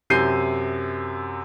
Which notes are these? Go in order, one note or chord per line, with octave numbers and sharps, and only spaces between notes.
F#2 C3 G6 C7 D#7